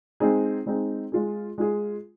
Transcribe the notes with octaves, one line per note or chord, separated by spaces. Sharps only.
G#3 C4 D#4 G#4
G#3 C4 D#4 G#4
G#3 F4 G#4
G#3 F4 G#4